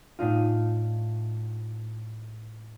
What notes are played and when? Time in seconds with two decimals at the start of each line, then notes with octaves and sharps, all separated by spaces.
0.19 A2 D4 D#4 F4